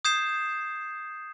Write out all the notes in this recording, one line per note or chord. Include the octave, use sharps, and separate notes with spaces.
D#6 G6 G#6 C7 E7